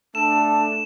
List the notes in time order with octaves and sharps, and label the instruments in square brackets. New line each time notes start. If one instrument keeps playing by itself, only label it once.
[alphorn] A3 [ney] D4 [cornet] A4 [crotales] E7